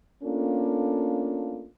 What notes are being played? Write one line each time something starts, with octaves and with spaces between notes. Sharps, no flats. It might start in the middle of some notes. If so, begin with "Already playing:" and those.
A3 A#3 C#4 D4 F4 A4